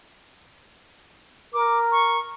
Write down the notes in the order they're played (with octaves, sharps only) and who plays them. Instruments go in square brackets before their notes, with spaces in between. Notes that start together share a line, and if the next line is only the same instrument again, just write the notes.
[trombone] A#4 [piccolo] D6
[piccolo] C#6